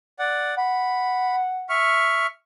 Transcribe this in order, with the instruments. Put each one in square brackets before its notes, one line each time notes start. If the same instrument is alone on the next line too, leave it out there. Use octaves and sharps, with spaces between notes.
[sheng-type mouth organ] D5 F#5
[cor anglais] F#5 [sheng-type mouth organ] B5
[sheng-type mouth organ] E5 C#6 F6